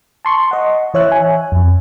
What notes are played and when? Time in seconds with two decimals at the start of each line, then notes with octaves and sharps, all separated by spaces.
0.25 A5 C6 C#6
0.51 D#5 F#5
0.94 E3 C#5 E5 F#6
1.12 G#5
1.52 F2